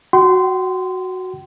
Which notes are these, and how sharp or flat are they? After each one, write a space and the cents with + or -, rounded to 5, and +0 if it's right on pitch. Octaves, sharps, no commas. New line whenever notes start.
F#4 +0 G5 -40 C6 -20